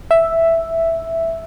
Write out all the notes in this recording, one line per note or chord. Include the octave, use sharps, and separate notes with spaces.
E5